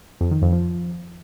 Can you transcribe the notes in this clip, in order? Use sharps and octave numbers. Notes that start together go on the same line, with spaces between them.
F2
D#3
F2
F3